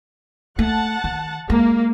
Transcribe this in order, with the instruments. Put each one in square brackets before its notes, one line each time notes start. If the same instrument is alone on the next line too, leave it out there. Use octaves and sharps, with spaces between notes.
[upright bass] A3 [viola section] F#5 A5
[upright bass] D#3
[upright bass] G#3 [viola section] A#3